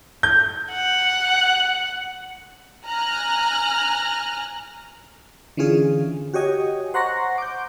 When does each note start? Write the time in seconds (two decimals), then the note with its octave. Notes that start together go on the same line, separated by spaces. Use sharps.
0.23 G6
0.73 F#5
2.87 G#5 A#5 F6 F#6
5.57 D3 E3 C#4 F4 G#4
6.34 F#4 G4 C#5 D#5 G#5
6.94 C5 F#5 A#5 C6 C#6 A#6
7.38 D6 G6